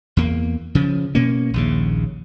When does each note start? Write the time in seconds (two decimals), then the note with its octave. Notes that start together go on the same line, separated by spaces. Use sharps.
0.17 E2 A#3
0.75 C#3 F3
1.15 B2 A#3 C#4
1.54 A#1 D#2 C#3